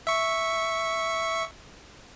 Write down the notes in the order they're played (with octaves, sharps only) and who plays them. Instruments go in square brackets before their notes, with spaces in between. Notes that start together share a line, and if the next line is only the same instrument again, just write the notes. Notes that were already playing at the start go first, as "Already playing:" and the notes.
[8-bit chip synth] E5 C#6